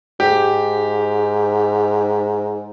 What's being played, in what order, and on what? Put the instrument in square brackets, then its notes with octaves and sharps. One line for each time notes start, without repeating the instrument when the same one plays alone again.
[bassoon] G#2 [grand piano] G4